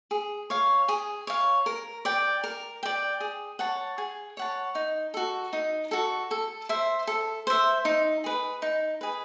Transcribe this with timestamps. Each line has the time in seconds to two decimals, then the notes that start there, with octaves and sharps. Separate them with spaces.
0.11 G#4
0.50 C#5 F5
0.88 G#4
1.27 C#5 F5
1.66 A#4
2.05 D5 G5
2.44 A#4
2.83 D5 G5
3.20 G#4
3.59 C#5 F#5 A5
3.98 G#4
4.37 C#5 F#5 A5
4.75 D#4
5.14 F#4 A4
5.53 D#4
5.91 F#4 A4
6.31 A4
6.69 C5 E5
7.07 A4
7.47 C5 E5
7.85 D#4
8.24 G#4 B4
8.62 D#4
9.01 G#4 B4